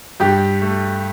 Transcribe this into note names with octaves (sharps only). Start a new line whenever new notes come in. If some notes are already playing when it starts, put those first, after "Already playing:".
G2 G4
A3